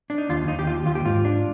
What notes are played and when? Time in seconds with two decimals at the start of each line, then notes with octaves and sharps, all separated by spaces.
0.10 D4
0.18 D#4
0.29 D#2 F4
0.48 D#2 D#4
0.59 G4
0.67 D#2 F4
0.86 D#2 F4
0.95 G4
1.05 G#2 F4
1.25 D4